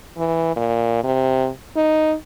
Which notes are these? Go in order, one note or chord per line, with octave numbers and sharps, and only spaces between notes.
E3
A#2
C3
D#4